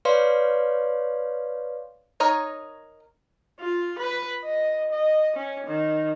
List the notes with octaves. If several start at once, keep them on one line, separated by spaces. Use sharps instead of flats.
B4 C#5 D5 F5 C6
D#4 A#4 C#5 D#5
F4
B4
D#5
D#5
C#4
D#3